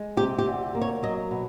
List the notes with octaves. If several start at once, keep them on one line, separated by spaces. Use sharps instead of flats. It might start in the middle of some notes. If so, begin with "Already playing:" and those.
Already playing: G#3
C3 G4
G4
D2
A#3
C#5
F#3 D#5
B2